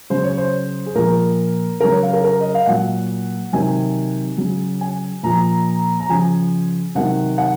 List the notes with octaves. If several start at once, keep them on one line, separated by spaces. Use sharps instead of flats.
C#3 F#3 C5
C#5
C5
G#4
A#2 F3 A#4
C#3 F#3 A#4
C#5
F5
A#4
A#4
D#5
F5
A#2 F#3 F#5
C3 D#3 F#3 G#5
C#3 F#3
G#5
A#2 F3 A#5
A#5
C#3 F3 G#5
C3 D#3 F#3 F#5
F#5